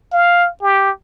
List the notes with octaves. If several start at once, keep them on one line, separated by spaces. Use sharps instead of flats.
F5
G4